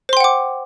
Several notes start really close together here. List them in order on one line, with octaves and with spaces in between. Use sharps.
C5 C6 G5 F#5 D6